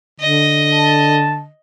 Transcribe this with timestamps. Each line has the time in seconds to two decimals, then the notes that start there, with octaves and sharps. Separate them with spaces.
0.20 D3 D#5
0.72 A5